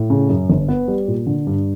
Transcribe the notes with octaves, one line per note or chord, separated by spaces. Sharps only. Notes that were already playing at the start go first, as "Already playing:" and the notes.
Already playing: A2
C#3
F#2
G1
B3
G3
A#2
D3
G2